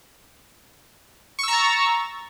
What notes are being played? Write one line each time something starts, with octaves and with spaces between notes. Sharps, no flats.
A#5 C#6 E6 A6